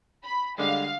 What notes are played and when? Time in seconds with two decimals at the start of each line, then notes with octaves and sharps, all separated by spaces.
0.25 B5
0.58 D3 G3 G#3 F5